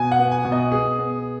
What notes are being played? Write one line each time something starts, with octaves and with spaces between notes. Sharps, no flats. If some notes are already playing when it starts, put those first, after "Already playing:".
Already playing: B2 G#5
F#5
B3
G#5
B2
D#5
B3 G#4
B3